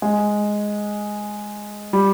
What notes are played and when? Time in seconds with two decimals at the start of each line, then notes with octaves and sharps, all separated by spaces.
0.02 G#3
1.93 G3